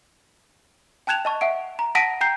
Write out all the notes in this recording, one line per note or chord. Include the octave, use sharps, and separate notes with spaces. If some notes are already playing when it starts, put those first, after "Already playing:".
G5 A5 F#6 G#6 E7 F7
D#5 A5 C#6
E5 F#5 D7
A#5
F#5 A5 A#6 B6 D7 D#7
G5 A#5 G6 C7